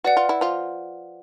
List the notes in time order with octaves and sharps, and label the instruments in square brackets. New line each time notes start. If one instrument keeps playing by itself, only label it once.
[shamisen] F#4 [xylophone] B4 D5 F#5
[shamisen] F4
E4
F3 F4